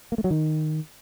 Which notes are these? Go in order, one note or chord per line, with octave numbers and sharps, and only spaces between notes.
A#3
A3
F#3
D#3